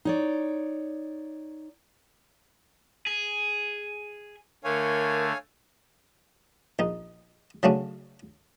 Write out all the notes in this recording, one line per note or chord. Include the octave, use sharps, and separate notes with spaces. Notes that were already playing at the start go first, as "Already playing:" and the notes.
D#4 C#5 D5
G#4
D3 A3 A#4 C#5 F5 G#5
A#1 D#4
C#3 F#3 A3 C#4 D4